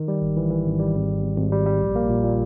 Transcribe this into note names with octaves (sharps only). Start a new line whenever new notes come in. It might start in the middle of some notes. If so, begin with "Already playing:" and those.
Already playing: D#3
G3
G#1
E3
E3
G#1
G3
G#1
G#1
G#1
G#1
G3
G3
A#1
A#3
A#2
A#2